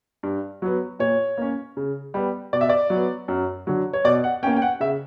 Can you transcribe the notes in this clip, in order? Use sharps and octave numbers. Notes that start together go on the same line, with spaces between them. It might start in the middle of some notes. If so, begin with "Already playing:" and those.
G2
F#3 B3
A#2 C#5
A#3 C#4
C#3
G3 B3
B2 D5
E5
D5
F#3
B3
F#2
D3 F#3
C#5
B2 D5
F#5
A#3 C#4 G5
G5
F#5
C#3 E5